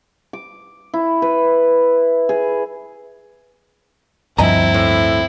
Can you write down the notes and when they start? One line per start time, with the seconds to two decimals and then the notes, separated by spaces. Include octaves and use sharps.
0.33 D6
0.94 E4
1.22 B4
2.29 G#4
4.38 D2 G2 F3 C4 E4 D#5 G#5 A#5
4.74 A2